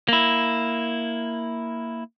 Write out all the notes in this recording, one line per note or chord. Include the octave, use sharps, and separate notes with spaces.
A#3 E4